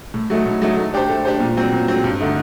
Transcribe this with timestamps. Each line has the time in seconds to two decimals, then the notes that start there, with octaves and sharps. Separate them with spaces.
0.14 A2
0.30 F#3 A3 D#4
0.46 A2
0.62 F#3 A3 D#4
0.77 A3
0.94 D4 G4 C5
1.09 A3
1.25 D4 G4 C5
1.40 A#2
1.57 F#3 C4
1.73 A#2
1.88 F#3 C4
2.04 G2
2.20 D3 A3 D#4